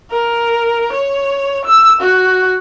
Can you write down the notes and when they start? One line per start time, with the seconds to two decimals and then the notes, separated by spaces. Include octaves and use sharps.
0.11 A#4
0.93 C#5
1.65 E6
2.01 F#4